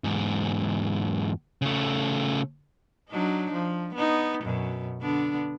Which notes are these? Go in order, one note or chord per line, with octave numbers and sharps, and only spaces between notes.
E2 G#2
C#3 A3
F#3 D4 D#4
F3
B3 D#4
F#2 B2
D3 B3 D4